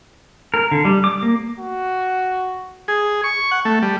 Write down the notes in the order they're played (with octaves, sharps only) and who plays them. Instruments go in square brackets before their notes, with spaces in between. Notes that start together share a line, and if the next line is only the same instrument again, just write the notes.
[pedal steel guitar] A#4
D3
G3
D6
A#3
[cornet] F#4
[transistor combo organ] G#4
C#6
F#5
A3
G3